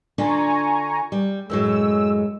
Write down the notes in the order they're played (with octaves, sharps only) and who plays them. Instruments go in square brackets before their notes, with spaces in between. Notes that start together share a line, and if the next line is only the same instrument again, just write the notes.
[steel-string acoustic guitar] D3 D4 F4 [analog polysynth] G#5 A#5 C#6
[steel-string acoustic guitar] G3
[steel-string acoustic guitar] F#2 A2 F#3 [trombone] G#3 [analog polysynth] E6